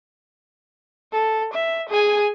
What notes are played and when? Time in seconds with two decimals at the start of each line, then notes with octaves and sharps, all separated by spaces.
1.12 A4
1.53 E5
1.89 G#4 G#5